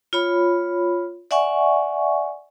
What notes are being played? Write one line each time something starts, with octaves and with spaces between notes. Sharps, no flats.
F4 C#5 B5
D5 E5 F#5 G#5 C#6